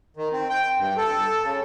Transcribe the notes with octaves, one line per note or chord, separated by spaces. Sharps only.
D#3
C4
G5
G2
A4
C#3